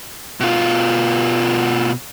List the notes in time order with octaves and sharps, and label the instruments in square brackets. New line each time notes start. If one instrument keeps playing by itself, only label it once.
[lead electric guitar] B2 F4